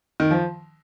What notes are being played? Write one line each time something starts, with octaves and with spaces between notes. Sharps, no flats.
D#3
F3